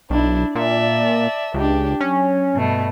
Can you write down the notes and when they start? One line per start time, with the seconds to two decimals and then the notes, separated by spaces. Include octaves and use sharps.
0.10 B1 D4 E4
0.55 A#2 D5 E5 A5
1.54 C#2 D4 G4
2.01 F#3 C#4
2.56 G2 B2 A3